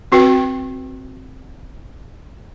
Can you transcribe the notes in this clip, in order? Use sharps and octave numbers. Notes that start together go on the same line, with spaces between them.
C4 F#4 B4 G5